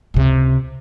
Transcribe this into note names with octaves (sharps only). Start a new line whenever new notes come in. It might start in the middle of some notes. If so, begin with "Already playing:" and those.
C#2 C3